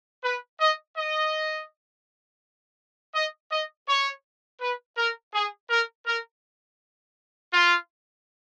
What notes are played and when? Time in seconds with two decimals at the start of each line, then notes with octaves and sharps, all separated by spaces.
0.24 B4
0.60 D#5
0.97 D#5
3.15 D#5
3.51 D#5
3.88 C#5
4.61 B4
4.97 A#4
5.34 G#4
5.70 A#4
6.06 A#4
7.53 F4